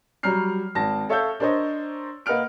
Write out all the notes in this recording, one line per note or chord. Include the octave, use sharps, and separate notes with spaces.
F#3 G3 C#5 A#5 F6 C7
G#1 A5 A#6
A4 C#5 E5 F5 E6 G6
D4 A#4 C5 C#5 D#5
A#3 B4 D#5 F#5 F6 D7